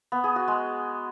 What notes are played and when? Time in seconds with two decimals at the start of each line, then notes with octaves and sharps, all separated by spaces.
0.12 B3
0.24 G#4
0.36 F#4
0.48 G#3